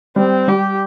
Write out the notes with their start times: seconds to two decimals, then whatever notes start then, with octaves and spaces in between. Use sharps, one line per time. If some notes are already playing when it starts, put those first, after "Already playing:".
0.16 G3 C4
0.48 G3 G4